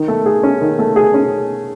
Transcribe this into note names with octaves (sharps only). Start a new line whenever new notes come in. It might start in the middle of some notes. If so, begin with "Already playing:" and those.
Already playing: D#3
A3
G#4
C#4
D#3
A3
G#4
C#4